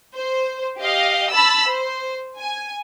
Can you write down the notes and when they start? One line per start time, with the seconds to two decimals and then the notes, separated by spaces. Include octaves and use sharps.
0.14 C5
0.79 G4 D#5 F5
1.31 A5 B5 E6
1.68 C5
2.39 G#5